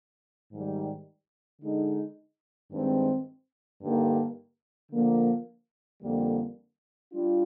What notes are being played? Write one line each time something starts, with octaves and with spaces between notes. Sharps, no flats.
G#2 D#3 G3
D3 G#3 D#4
G2 D#3 G#3 C4
G2 D3 G3 A#3 D#4
D3 F3 A#3
F2 D3 G3 A#3
G3 D4 F4